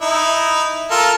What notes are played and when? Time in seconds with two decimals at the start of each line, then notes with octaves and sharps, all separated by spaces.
0.01 D#4 E4
0.91 F4 A4 A#4